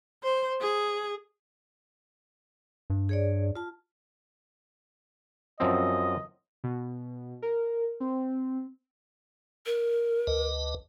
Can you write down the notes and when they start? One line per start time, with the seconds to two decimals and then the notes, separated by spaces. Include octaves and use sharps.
0.23 C5
0.61 G#4
2.90 G2
3.09 G#4 C#5 D5
3.56 F4 A5
5.60 F#2 F3 C4 D#5
6.64 B2
7.42 A#4
8.00 C4
9.66 A#4
10.27 D2 B4 D#5